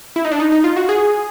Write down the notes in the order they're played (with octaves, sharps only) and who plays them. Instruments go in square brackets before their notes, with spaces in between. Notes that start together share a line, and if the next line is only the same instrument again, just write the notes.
[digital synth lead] E4
D#4
D4
D#4
D#4
F4
F#4
G#4